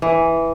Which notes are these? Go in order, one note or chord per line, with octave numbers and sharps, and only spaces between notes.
E3